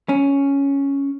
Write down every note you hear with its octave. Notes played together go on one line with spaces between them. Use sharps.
C#4